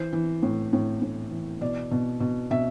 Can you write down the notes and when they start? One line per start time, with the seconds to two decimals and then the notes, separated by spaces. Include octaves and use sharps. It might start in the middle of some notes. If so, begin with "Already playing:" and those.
Already playing: E3 C5
0.13 E3
0.43 A2
0.73 A2
1.02 A2
1.31 E3
1.61 B2 D5
1.91 B2
2.20 B2
2.51 B2 E5